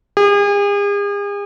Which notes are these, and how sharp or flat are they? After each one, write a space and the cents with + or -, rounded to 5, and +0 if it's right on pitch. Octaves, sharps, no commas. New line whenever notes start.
G#4 -40